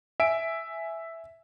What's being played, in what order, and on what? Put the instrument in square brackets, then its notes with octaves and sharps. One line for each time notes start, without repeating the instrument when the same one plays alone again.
[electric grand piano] E5 G#5 D7